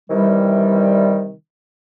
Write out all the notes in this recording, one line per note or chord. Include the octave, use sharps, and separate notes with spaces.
C3 D#3 E3 G3